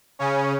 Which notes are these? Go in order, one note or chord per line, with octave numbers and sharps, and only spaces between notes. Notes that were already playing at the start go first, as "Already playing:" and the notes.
C#3 C#4